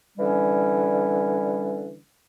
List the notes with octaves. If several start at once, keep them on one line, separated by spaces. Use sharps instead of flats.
D3 E3 G3 C#4